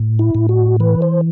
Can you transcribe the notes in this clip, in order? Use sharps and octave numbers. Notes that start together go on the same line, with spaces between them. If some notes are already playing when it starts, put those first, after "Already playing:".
Already playing: A2
E4
A2
F#4
E3 B4
C5